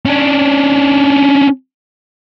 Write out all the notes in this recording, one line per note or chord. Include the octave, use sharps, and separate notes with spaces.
C#4 D4